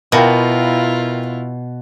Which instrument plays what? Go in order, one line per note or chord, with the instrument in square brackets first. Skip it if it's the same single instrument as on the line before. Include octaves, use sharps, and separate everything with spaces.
[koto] B2 [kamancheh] E4 F4 [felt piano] A#4 F5 G5